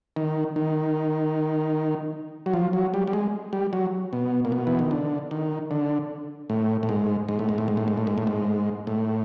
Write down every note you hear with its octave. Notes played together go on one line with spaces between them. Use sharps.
D#3
D#3
F#3
F3
F#3
G3
G3
G#3
G3
F#3
B2
A#2
B2
E3
D#3
D3
D#3
D3
A2
A2
G#2
G#2
A2
G#2
A2
G#2
A2
G#2
A2
G#2
A2
G#2
A2